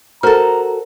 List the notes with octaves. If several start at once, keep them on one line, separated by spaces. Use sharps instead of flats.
F#4 A4 A#4 C5 A#5 F6